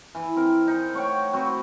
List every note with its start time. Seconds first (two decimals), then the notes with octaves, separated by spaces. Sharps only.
0.15 E3
0.36 C4 A#4
0.67 D#4
0.94 A3 C#5 F#5 G5
1.33 C4 F#4 B4